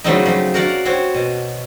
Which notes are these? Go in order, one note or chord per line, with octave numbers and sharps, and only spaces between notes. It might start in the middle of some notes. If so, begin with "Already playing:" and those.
C#3 F#3 G3 A3 C4 D#4
F3 F#3
F#4 A#4 D5 F5 F#5
C4 F#4 C#5
B2